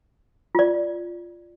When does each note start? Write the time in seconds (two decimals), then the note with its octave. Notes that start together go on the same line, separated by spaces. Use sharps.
0.55 F4 D5